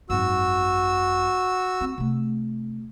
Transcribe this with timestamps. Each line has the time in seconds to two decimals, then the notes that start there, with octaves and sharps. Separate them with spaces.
0.10 G#1 F#2 F#4 E6
1.81 C4
1.98 C3 A3